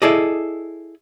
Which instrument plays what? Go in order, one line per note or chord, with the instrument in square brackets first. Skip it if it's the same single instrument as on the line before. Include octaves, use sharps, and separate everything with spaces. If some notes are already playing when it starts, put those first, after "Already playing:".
[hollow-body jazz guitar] E4 G#4 A4 D5 D#5